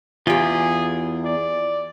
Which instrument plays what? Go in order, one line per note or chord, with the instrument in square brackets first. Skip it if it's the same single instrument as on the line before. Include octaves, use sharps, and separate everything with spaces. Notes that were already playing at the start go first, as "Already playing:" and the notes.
[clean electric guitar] E2 [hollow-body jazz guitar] F4 G4 [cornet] G#4
[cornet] D5